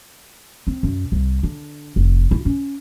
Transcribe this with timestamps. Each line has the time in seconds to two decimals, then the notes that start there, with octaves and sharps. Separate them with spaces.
0.67 C4
0.83 F#2
1.12 C2
1.43 D3
1.96 F1
2.31 E4
2.45 C#4